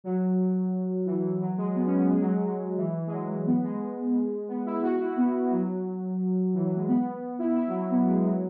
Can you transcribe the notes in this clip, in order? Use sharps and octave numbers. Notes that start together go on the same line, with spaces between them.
F#3
E3
F#3
G#3
B3
C#4
B3
G#3
F#3
F#3
E3
G#3
F#3
G#3
B3
G#3
B3
E4
F#4
E4
B3
F#3
E3
F#3
G#3
B3
E4
E4
F#3
F#3
B3
G#3
F#3